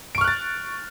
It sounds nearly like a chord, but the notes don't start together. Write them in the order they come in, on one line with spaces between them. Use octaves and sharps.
D7 C#6 F6 F#6 A6